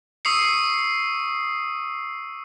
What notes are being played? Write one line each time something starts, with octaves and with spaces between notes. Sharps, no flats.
C#6 D#6 E6 C7 C#7